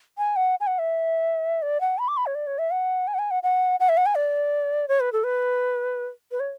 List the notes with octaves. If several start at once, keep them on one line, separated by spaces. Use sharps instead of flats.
G#5
F#5
G#5
F#5
E5
D5
F#5
B5
D6
B5
C#5
D5
C#5
E5
F#5
G#5
F#5
G#5
F#5
F#5
F#5
E5
F#5
G#5
D5
C#5
B4
A4
B4
B4
C#5